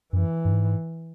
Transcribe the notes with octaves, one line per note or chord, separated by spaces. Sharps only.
F#2 E3
G2
G#2